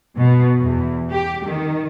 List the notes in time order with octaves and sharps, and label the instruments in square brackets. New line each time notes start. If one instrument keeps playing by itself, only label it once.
[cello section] B2
E2
G4
D#3